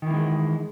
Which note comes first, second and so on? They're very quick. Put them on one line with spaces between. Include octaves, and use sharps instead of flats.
D#3 E3 A#3 G#3